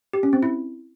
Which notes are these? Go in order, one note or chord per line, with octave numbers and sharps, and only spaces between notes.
G4
C#4
C4
E4